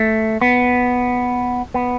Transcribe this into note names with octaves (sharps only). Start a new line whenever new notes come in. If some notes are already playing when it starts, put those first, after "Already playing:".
Already playing: A3
B3
B3